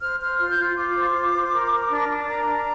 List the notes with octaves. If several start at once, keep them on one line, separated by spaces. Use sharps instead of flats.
C5 F6
C5 F6
F4 F6
G6
F4 F6
F4 D6
C5
F4
C5
A#4
A#4
D4
D4
A#4 A#5
D4